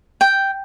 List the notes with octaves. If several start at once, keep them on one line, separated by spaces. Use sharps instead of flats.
G5